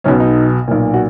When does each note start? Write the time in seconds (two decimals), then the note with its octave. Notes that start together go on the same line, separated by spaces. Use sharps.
0.04 B1 B2 C#4
0.20 D#4
0.68 B1 A#2
0.94 F#4